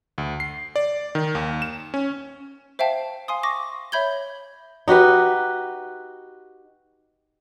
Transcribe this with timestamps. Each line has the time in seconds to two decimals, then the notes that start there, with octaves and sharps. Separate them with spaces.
0.18 D2
0.40 C7
0.76 D5
1.15 D#3
1.35 D#2
1.62 E7
1.94 C#4
2.79 C5 E5 F5 G5 A5
3.28 F5 G#5 C6 D#6
3.43 C#6 D6 A#6
3.92 C#5 E5 B5 G6 G#6 G7
4.88 D#4 F#4 G4 B4